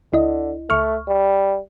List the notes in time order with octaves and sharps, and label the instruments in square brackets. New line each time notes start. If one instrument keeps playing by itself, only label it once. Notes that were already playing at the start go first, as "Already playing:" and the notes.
[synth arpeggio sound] C#2 E4 D#5 [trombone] D3
[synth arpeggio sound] C#2 C#6 F6 [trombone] A3
[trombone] G3